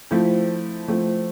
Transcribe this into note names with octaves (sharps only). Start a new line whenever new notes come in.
F3 A3 C4 E4
F3 A3 C4